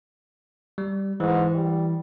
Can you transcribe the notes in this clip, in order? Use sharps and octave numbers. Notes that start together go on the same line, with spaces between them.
G3
G#2 E3
G3